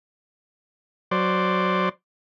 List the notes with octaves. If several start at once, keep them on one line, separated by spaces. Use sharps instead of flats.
F#3 C5 D5